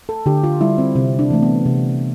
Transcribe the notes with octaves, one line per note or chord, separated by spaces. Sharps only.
A4
D3 G4
F4
G3 E4
C4
C3 C4
D4
E3 A3
B3
C3